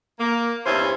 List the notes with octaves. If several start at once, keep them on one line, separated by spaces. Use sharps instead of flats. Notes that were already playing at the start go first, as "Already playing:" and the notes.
A#3
E2 G2 C#4 C5 E5